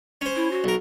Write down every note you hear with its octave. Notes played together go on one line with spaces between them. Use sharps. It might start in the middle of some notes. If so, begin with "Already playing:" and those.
C#4 C5
E4
F#4
B1 A#4